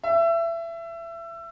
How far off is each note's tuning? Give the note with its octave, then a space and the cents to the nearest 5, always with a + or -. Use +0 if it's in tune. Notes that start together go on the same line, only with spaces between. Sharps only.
E5 +25